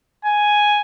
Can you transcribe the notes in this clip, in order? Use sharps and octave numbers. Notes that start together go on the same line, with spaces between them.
G#5